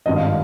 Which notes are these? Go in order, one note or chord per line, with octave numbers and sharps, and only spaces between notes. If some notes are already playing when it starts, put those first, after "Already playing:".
G#1 G2 F3 D#5
F5